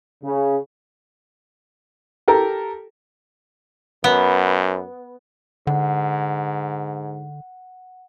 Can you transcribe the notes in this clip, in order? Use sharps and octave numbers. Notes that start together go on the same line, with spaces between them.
C#3
G4 A4 A#4
F#2 B3
G#2 D3 F#5